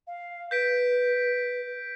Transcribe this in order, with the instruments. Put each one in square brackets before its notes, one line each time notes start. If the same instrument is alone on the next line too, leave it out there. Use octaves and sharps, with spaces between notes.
[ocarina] F5
[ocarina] B4 [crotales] G6 B6 D7